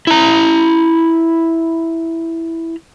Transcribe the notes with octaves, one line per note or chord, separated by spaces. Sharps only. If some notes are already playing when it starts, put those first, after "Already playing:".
E4 A#5